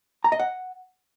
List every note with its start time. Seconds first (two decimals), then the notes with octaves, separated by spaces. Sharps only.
0.24 A#5
0.32 D#5
0.39 F#5